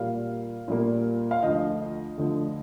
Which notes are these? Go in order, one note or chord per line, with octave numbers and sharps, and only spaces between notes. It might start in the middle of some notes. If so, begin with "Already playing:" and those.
Already playing: A#2 G3 A#3 F5
A#2 G3 A#3
F5
D2 D3 F3 D#5
D2 D3 F3